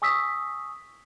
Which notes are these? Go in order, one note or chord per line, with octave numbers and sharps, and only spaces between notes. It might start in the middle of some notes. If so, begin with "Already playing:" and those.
G#5 C#6 D#6 E6 B6